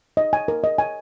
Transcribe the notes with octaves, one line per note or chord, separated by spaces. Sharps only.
D#5
G#5
A#4
D#5
G#5